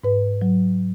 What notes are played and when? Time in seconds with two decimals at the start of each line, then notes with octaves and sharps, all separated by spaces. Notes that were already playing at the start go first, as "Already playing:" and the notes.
0.04 G#2 B4
0.42 F#3